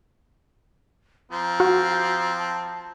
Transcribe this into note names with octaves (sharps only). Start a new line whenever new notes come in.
F3 C4 A#5
F#4
A5